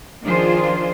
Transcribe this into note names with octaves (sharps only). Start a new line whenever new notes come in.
D#3 F3 D4 F4 G#4 C5